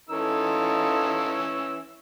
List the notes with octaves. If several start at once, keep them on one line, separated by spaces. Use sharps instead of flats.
E3 C#4 D#4 F4 A4 E6